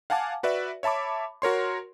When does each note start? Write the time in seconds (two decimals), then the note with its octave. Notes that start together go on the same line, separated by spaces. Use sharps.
0.10 F5 F#5 G#5 A5 D6
0.43 F#4 B4 D5 E5
0.83 C#5 E5 A5 B5 D6
1.42 F#4 A#4 C#5 C6